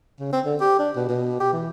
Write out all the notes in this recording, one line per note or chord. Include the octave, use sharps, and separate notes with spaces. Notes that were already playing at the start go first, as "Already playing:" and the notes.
C#3
C4
D3
G4
D4
B2
B2
G4
E3